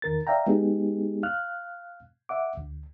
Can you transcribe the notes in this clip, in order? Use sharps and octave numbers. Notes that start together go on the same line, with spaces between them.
E2 D#3 A#4 A6
D5 E5 F5 G5 A#5
G#3 B3 D#4 G4 G#4
F5 F6 F#6
E5 F#5 D6
D2